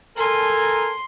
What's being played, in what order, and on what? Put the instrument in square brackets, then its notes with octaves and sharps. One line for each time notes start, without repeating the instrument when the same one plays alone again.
[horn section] A4 A#4 G#5 [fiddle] C6